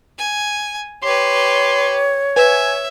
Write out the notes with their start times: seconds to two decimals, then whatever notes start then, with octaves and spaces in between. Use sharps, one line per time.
0.18 G#5
1.03 G4 B4 C#5 C6
2.36 B4 E5 G#5